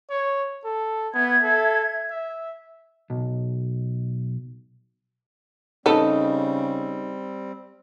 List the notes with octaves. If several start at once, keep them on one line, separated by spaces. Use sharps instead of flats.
C#5
A4
B3 E5 G#6
A4
E5
B1
C#3 G3 C4 D#4 A4 B4